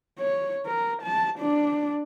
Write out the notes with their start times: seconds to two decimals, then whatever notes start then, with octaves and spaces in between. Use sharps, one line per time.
0.19 C#5
0.66 A#4
1.03 A5
1.39 D4